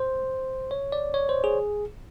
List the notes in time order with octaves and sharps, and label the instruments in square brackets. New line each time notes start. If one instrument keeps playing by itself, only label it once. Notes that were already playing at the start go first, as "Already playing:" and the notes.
Already playing: [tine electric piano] C5
C#5
D5
C#5
C5
G#4